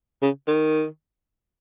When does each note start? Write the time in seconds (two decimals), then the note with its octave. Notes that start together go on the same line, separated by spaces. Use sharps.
0.22 C#3
0.47 D#3